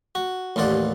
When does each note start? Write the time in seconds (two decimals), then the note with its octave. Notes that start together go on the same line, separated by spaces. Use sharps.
0.15 F#4
0.56 A1 D#2 F4 D5 F#5